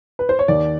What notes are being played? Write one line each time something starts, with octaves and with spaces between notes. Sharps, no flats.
B4
C5
C#5
D#2 D5